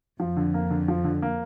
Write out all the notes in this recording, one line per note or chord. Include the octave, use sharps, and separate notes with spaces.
F2 F3
D3
A#3
D3
F3
D3
A#3